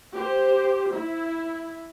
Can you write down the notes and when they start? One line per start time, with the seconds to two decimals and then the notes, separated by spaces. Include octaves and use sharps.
0.14 G4 C5
0.92 E4